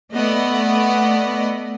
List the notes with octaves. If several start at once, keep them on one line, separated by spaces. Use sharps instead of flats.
A3 B3 D5 D#5 F#5